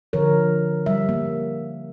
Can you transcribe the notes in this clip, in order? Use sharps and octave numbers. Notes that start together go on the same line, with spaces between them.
D3 F3 A#4 C#5
G3 E5
A#3